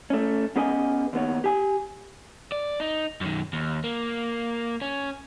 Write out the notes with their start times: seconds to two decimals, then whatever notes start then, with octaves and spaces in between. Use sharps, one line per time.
0.10 A3 C#4
0.56 B3 C#4 G#4 B4 D#5 G#5
1.13 D#2 B3 C#5
1.44 G4 G#5
2.52 D5
2.80 D#4
3.21 F#2 D#3
3.53 D#2
3.84 A#3
4.82 C#4